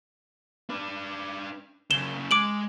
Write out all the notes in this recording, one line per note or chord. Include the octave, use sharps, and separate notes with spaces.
D4 B4
F#2 C#3 E7 G7
G#3 D6 D7 F#7